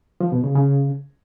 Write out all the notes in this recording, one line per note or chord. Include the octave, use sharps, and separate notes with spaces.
F3
B2
C#3
C#3